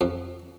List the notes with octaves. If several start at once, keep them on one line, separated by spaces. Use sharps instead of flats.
F2